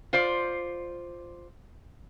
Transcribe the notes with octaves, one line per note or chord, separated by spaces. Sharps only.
F4 C5 D5